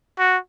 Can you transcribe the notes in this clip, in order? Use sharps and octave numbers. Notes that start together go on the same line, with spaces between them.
F#4